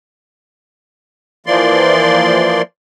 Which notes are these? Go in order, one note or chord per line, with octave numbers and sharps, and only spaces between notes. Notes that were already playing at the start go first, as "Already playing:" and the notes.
E3 F3 A#3 D5 C6